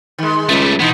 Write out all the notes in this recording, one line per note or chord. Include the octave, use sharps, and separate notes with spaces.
D#3 G#3
C#2 G3 A3
B2 E3 B3 D#4